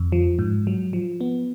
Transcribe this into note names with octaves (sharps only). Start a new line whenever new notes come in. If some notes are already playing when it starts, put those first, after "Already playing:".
Already playing: F2
F3
G#2
F#3
F3
B3